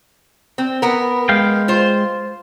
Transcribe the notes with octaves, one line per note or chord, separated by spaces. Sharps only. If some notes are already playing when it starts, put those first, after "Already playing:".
C4
B3 A#4
G#3 F5 G5
F4 C5